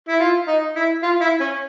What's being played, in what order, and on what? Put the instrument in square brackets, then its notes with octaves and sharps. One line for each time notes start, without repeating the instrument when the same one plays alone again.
[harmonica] E4
F4
D#4
E4
F4
E4
C#4